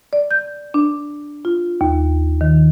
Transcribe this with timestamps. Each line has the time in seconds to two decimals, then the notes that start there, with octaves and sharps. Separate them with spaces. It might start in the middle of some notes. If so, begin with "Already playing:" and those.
0.13 D5
0.31 G6
0.74 D4
1.45 F4
1.81 D#2
2.41 D#3